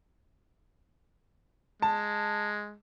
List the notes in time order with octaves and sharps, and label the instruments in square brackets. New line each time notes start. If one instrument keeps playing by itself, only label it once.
[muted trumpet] G#3 [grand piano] A5